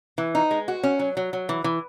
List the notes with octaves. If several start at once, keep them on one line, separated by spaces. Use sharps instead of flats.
E3
D#4
G#3
F#4
C#4
F#3
F#3
F#3
E3
E3